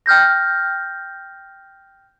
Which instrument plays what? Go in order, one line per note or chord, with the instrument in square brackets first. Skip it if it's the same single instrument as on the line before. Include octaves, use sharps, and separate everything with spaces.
[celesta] G5 F6 G6 A#6